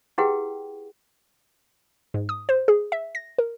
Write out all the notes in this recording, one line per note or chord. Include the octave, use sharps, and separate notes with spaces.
E4 G4 G#4 B4 F#5 G5
G#2
D#6
C5
G#4
E5
A#6
A#4